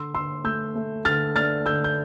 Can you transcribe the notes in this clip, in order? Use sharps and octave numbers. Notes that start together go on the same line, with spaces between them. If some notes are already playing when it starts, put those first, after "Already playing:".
Already playing: D3 C6 E6
D3 C6 E6
A3 E6 G6
A3
D3 F6 A6
D4 F6 A6
D3 E6 G6
G6